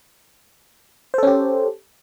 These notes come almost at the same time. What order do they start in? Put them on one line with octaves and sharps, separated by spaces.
C5 A4 C#4 G4